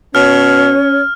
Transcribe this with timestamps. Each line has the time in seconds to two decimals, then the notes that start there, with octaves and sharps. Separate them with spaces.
0.15 B2 C#4 C#5 F6